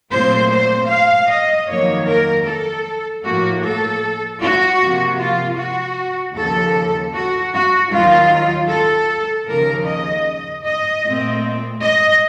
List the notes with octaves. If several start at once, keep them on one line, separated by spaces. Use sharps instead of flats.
A#2 F#3 A3 C4 C5
C5
F5
D#5
F2 D#3 F#3 A#3 C#5
A#4
A4
A2 F3 A#3 F#4
A4
F#4
C3 F3 A#3
F4
F#4
D#2 C#3 F3 A4
F#4
F#4
D#2 D#3 F#3 F4
A4
D#2 C#3 F3 A#4
D#5
D#5
A#2 A3 C4
D#5